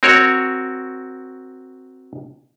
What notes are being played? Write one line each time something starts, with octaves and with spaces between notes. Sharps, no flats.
C4 F#4 A#4 C#5